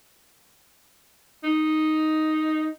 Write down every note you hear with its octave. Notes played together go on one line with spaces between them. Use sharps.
D#4